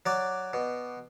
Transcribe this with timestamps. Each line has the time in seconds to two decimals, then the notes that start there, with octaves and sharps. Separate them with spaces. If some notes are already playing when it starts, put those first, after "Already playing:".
0.06 F#3 D5
0.53 B2